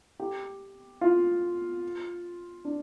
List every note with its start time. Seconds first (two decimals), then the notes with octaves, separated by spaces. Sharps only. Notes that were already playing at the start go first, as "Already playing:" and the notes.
0.20 G4
1.01 F4
2.65 D4